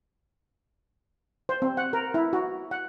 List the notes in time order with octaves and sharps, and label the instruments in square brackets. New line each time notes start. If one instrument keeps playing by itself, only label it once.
[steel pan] C5
C4
F#5
A#4
E4
F#4
F#5